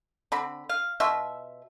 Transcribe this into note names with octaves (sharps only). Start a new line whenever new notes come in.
D3 C4 B5
F5
B2 F4 E5